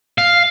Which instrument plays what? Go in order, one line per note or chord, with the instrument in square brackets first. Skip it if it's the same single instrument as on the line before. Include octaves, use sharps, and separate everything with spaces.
[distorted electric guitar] F5